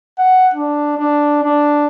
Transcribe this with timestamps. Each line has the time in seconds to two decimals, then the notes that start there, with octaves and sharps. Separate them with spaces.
0.18 F#5
0.54 D4
0.97 D4
1.43 D4